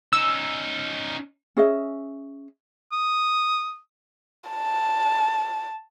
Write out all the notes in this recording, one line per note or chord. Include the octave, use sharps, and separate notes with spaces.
C#4 D#4 E6
C#4 G#4 D#5 E5
D#6
A5